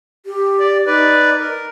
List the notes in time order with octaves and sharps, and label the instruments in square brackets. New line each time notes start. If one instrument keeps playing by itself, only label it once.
[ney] G4
[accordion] D5
[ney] D#4 [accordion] B4 D5
[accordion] A#4